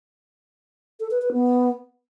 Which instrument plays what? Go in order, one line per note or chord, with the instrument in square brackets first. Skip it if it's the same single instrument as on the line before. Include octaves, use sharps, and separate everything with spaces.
[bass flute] A4
B4
B4
B3